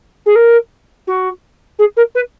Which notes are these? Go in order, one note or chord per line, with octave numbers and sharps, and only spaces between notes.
G#4
A#4
F#4
G#4
A#4
B4